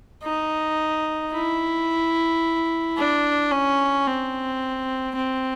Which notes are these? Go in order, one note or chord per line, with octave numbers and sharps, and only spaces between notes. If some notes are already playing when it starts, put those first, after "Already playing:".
D#4
E4
D4
C#4
C4
C4